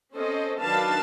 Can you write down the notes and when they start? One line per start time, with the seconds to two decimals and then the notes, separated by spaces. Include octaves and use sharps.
0.14 C4 C#4 A4 C5 D#5
0.59 D#3 F#3 D4 B4 F5 A5